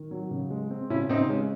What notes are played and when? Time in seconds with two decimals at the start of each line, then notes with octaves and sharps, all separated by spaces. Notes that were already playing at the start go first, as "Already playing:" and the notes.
Already playing: D#3
0.11 F#3
0.31 C#3
0.50 G#3
0.71 C4
0.90 C#3 C#4 E4
1.09 C#3 C4 D#4
1.29 G#3 C#4